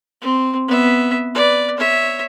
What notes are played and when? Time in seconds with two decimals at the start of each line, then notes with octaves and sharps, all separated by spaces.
0.21 C4
0.68 B3 E5
1.34 B4 D5
1.77 C#5 E5